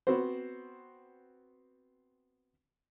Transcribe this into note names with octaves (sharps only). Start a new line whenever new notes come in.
B3 C4 F#4 C5